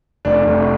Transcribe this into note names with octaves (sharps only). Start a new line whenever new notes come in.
F1 D4
F1